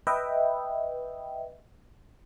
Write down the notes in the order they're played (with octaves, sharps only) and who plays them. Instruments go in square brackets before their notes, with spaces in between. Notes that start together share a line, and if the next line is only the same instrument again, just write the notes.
[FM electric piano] B4 D#5 E5 G5